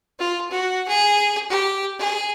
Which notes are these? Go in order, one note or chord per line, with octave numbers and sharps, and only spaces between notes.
F4
F#4
G#4
G4
G#4